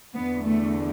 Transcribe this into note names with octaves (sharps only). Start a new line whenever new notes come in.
E2 D3 B3
A3